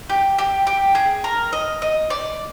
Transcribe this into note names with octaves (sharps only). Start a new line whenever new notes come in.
G4
G4
G4
G#4
A#4
D#5
D#5
D5